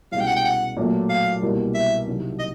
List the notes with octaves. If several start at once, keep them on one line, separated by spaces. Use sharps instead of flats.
C2 B2 G#3 C#4 F5
G5
F#5
G5
F#5
A#2 F#3 A3
F5
C2 B2 G3 A#3
E5
C2 C3 D#3 F#3
D#5